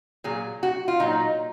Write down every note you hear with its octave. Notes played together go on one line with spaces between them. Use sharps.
A#2 F#3 G#4
F#4
F4
A#2 F#3 D#4